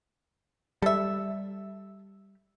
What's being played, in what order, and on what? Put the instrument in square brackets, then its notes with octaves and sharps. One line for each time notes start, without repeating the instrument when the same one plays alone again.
[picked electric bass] G3 [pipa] A4 E5